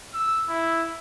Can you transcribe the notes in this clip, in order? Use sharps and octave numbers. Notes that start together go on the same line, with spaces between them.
E6
E4